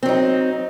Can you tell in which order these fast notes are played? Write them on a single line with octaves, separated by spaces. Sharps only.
C4 F#3 D#4